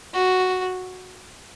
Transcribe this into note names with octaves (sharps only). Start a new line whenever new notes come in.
F#4